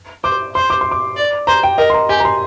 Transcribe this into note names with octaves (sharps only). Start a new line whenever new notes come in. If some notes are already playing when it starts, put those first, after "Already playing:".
C5 D6
C5 C6
D6
C6
D6
D5
C5 A#5
G5
A#4 D#5
C6
A#5
G4 G#5
A#5
C6